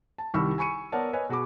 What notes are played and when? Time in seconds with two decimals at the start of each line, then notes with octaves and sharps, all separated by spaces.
0.18 A5
0.34 C2 D#3 G3 B5 C#6 E6
0.58 G#5 B5 C#6 C#7 D#7
0.92 B3 A#4 C#5 D5 F#5 A5
1.13 B4 C#5 D#5 G#5
1.29 B2 F#4 G#4 B5 D6